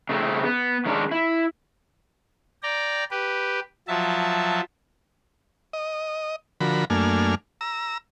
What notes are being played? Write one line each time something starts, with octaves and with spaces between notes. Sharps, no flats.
C#3 A3 C4
B3
D#3 G#3 C#4 D4
E4
D5 G5 A#5
G4 B4
F3 F#3 E5 A5
D#5
D3 F3 F#4 A#4 B5
F#2 A3 A#3 D4 G#5 F6
A#5 E6